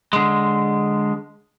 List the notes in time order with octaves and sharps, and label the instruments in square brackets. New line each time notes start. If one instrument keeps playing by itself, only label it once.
[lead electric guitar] D3 G#3